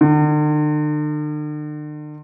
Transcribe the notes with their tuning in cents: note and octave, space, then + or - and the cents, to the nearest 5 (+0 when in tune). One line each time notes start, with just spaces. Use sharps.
D3 +45